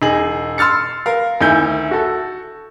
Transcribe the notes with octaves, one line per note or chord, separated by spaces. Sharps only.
E1 D#4 G#4 F#7
C6 E6 F6 A6 C#7
A#4 F5
D2 D#3 E4 G#5 G6
F#4 A4